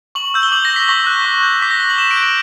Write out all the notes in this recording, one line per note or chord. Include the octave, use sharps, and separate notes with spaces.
C#6 F#7
E6 G6
G7
D6 F#7
G6 A#6
B6
C#6 A#6
F#6
C#6
G6
D6 B6
A#6
F#6 G7
F#7
D6 E7
D7
G6
D7